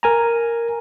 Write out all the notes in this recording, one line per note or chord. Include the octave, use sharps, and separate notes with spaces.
A#4 G#5 A#5